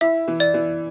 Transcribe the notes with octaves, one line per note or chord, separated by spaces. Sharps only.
E4 E5
E3
D5
E3